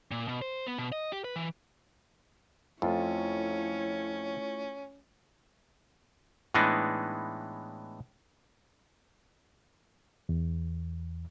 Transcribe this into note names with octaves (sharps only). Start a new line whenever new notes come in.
A#2
B2
C5
B3
B2
D#5
G4
B4
E3
F2 A3 C#4 E4 F4 C#5
A2 E3 G#3 B3 D4 D#4
E2